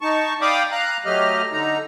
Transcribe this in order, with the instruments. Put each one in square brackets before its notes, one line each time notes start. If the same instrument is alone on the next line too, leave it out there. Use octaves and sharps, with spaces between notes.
[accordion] D#4 A5 C#6
D5 F5 G5 B5 D6 D#6
F5 A#5 F#6
F#3 A3 G4 D#5 F6
D3 D#4 A#5